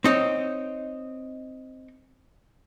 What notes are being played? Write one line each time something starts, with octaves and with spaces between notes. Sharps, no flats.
C4 D#4 C#5